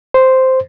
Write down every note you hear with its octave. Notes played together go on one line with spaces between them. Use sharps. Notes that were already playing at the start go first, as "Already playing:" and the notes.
C5